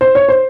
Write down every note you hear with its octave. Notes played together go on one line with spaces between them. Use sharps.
C5
C#5
C5